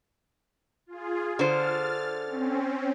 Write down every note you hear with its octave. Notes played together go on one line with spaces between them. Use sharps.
F4 G#4
D3 C5 F6 A6
C4 C#4